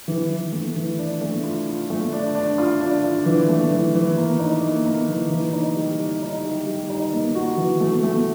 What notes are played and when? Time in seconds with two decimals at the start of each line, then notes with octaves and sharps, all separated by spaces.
0.08 E3
0.30 E3
0.53 A3
0.76 E3
0.99 D4
1.21 A3
1.44 F4
1.67 F4
1.90 A3
2.13 D4
2.35 D4
2.58 F4
2.81 D4
3.04 F4
3.26 E3
3.49 A3
3.71 E3
3.95 E3
4.17 A#3
4.39 D#4
4.63 A#3
4.85 A#3
5.08 E3
5.30 E3
5.53 D#4
5.76 G3
5.98 D#4
6.22 D#4
6.45 G3
6.66 G3
6.90 D#4
7.12 A#3
7.35 F#4
7.57 E3
7.80 A3
8.03 A3